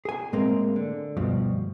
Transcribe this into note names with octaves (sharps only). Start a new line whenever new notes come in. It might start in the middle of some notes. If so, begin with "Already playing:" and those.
G#4 G#5
A2 G#3 A#3 C4
D3
D2 G2 B2 F3